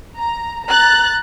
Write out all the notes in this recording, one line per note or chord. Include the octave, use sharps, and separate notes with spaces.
A#5
A#5 F#6 A6